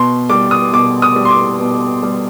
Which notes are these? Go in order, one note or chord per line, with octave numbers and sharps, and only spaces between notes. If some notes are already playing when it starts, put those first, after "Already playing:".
Already playing: B2 C6
G3 D6
D#6
B2 D6
D#6
G3
C6
D6
B2
G3